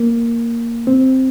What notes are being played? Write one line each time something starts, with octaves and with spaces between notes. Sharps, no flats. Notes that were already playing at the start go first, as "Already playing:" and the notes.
Already playing: A#3
C4